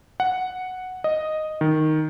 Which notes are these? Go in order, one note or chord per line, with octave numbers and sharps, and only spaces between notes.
F#5
D#5
D#3